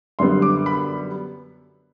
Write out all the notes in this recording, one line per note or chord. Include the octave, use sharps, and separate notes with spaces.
F#2 D3 G3 B3 C6
D6
B5